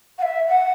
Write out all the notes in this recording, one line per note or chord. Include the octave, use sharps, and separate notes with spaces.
F#5
E5
F#5